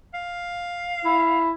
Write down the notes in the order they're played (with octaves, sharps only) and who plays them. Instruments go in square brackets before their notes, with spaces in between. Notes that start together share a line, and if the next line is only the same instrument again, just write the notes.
[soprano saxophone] F5
[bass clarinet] E4